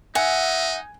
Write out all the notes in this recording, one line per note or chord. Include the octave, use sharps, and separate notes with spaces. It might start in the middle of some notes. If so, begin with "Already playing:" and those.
D#4 E5 F#5 G#5